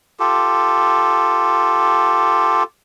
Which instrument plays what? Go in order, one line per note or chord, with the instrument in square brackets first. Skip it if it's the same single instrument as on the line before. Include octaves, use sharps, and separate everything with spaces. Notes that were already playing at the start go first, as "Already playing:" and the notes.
[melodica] F4 G4 A4